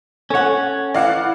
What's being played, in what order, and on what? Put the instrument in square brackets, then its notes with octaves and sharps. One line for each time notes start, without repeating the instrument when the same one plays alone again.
[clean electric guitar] C#4 C#5 [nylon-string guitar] A4 F#5
[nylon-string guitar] E3 E4 [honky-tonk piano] D5 F5 F#5